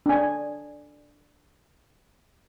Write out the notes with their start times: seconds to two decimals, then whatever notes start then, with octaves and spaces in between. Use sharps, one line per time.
0.06 D4 G#5